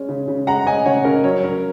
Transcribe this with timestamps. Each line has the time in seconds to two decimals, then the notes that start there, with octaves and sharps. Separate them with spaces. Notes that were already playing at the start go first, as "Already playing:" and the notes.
Already playing: G#3 C#4
0.09 C#3
0.28 C#3
0.47 G#3 F#5 A#5
0.66 C#4 D#5 G#5
0.86 C#3 C#5 F#5
1.05 C#3 A#4 D#5
1.24 F#3 C#5
1.43 C#4 A#4